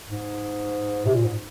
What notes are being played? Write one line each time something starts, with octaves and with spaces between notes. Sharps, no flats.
G#2
C3
A#2
G#2